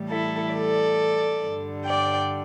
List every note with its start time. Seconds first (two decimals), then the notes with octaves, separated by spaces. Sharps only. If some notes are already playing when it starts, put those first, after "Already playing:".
Already playing: A2 E3 G3
0.10 E4 A4
0.53 A4 D5
1.43 G2 D3 G3
1.86 D5 G5